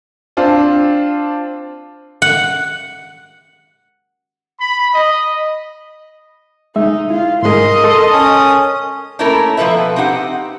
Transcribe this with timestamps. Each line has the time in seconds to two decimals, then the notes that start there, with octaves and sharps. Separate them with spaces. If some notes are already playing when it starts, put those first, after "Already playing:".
0.37 C4 D4 F4
2.22 F#5
4.59 B5
4.93 D#5
6.76 G#3 D#4 E5
7.10 E4 F4
7.43 G#2 G#3 A#4 D#5 C6
7.84 A4 A5 C6
8.12 C#4 D#6
9.19 A3 A#3 C#4 E4 A4 A#4
9.57 B2 F3 G3 A4 B4 E5
9.96 C4 D#4 G4 F#5